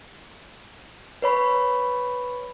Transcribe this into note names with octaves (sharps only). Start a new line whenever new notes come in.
B4 C#5 B5